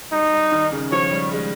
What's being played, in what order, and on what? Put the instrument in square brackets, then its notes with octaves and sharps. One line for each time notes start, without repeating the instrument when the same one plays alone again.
[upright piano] G3 [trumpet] D#4
[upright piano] G3
D#3
C#3
[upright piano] F3 [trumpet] C#5
[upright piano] G3
G#3